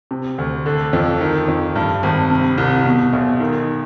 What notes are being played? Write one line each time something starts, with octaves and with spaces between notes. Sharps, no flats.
C3
D2
D3
F2
D#3
F2
G2
G#1
C3
C2
B2
B1
D#3